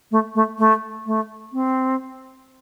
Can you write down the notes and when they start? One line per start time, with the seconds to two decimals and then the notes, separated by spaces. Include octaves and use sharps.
0.11 A3
0.35 A3
0.59 A3
1.06 A3
1.53 C4